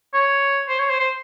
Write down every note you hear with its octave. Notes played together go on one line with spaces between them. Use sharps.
C#5
C5
C#5
C5
C5